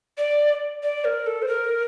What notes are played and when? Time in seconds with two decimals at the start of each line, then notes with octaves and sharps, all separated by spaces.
0.18 D5
0.83 D5
1.05 A#4
1.27 A4
1.42 C5
1.48 A#4